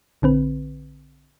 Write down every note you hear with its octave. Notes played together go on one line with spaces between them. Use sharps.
A#1 D3 C4 B4